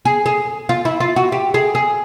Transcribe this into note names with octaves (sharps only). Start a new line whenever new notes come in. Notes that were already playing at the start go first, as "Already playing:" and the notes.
G#4
G#4
F4
E4
F4
F#4
G4
G#4
G#4